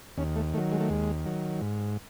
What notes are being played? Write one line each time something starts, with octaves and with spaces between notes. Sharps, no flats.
D#2 C#4
A3
D#3 F#3 A3
G#3
A3
D#2 G#3
D#3 F#3
G#2